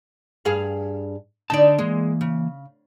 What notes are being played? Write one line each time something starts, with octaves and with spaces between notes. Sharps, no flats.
G2 G#4 F5
D3 D#4 D5 A5
E3 G#3 A#3
C#3